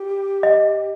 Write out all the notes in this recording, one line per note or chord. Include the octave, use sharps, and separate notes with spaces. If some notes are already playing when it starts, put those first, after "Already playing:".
Already playing: G4
D#5